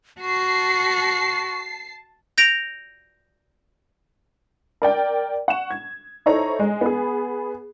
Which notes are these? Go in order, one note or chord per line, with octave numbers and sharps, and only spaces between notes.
F#4 A5 C#6 C7
G6 A#6 D7 F7
A#4 D5 G5
F#5 C#6 E7
G#6
D#4 E4 A4 C5 C#5 A#5
G#3
B3 G#4